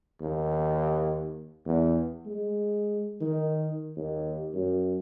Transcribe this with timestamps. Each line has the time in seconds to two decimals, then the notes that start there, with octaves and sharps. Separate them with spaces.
0.21 D#2
1.66 E2
2.26 G#3
3.21 D#3
3.97 D#2
4.54 F#2